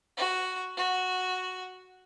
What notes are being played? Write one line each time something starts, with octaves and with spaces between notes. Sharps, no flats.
F#4
F#4